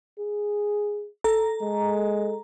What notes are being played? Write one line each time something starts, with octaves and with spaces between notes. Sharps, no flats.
G#4
A4 A#5
G#3